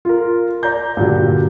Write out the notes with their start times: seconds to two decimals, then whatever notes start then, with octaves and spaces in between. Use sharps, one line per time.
0.05 F4 A#4
0.63 D5 A#5 G6
0.97 G2 A#2 D3 F#3